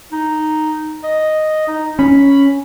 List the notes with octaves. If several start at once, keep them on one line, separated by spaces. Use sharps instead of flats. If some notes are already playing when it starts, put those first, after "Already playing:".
D#4
D#5
D#4
C#4 B5